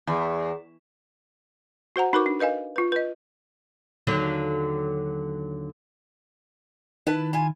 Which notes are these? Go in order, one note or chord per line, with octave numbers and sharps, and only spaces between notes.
E2
F#4 C5 F#5 A#5
D#4 F#4 A#4 B4 C#6 D6
D4
A#4 B4 D#5 F5 G#5
F4 B4
B4 D#5
D#2 D3 F#3
D#3 E4 B4 A5
E4 F4 G#5